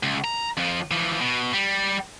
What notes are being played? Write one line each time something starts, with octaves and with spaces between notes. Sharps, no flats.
C#2
A#5
F2 F3
E3 F3
B2
G3